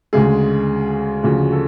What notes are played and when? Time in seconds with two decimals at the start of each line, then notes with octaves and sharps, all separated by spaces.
0.13 D2 C#3 G#3 G#4
1.23 D2 C#3 F3 F#4
1.52 A4